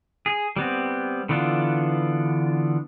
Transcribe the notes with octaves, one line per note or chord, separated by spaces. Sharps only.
G#4
G3 B3 C4
D3 E3 B3 D4 F4